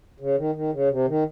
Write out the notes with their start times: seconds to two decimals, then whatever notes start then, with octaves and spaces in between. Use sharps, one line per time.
0.20 C#3
0.38 D#3
0.55 D#3
0.73 C#3
0.90 C3
1.08 D#3